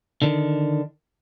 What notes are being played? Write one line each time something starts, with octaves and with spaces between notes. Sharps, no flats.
D3 D#3